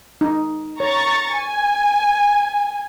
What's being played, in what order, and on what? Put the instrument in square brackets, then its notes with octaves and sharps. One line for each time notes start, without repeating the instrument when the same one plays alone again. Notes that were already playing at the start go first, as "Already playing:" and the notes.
[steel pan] D#4
[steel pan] C#5 [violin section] A#5 C#6 A6
[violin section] G#5